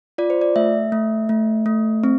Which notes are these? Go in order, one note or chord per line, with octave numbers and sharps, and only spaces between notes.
F4 D5
C5
D5
A3 E5
A3
A3
A3
C4